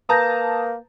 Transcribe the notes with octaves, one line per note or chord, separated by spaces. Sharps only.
A#3 B4 A5 A#5 D#6 G6 A#6